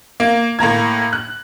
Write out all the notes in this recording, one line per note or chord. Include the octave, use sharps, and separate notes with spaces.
A#3
A2 A#3 A#5 G#6
F#6